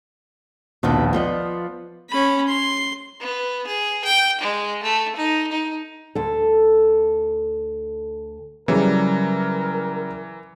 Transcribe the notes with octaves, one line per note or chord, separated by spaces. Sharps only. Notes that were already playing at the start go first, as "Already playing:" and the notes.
A#1 D#2 B2 F3 B3 D4
F3 B3 F4 D5 D#5
C#4 B5
C6
B3
G#4
G5
G#3
A3
D#4
D#4
D2 A4
C#3 E3 F#3 G3 A#4